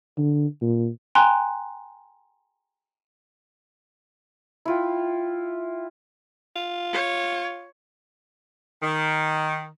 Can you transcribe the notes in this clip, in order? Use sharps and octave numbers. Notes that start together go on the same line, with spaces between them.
D3
A#2
G5 G#5 A#5 C6 F#6
E4 F4 G5
F4
C#5
D#3